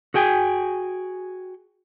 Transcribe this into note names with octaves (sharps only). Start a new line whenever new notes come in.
F#4 G#4 G5 G#5